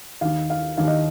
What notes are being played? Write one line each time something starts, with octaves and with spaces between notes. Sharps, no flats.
D#2 D#3 F5
F5
D#2 D#3 F5
D#5